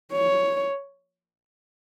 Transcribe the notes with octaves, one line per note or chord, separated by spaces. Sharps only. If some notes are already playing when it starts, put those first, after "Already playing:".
C#5